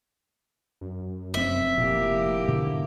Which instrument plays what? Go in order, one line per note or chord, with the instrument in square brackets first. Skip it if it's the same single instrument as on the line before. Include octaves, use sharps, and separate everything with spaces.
[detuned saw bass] F#2
[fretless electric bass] F1 C4 [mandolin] E5
[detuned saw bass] F1 [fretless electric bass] A#2 [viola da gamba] A#3 E4 G4
[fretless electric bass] G#2 B2 D3